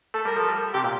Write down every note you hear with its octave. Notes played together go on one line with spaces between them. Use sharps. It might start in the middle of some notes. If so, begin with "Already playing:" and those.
A3 A4
G3 A#4
F3 A4
G3
C3 G4
A#2